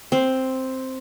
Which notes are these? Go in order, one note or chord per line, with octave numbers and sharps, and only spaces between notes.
C4